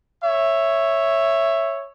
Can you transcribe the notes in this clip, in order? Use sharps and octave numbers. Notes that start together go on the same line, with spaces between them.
C#5 E5